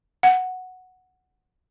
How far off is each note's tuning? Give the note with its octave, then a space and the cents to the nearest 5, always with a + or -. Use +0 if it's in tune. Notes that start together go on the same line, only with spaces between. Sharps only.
F#5 -5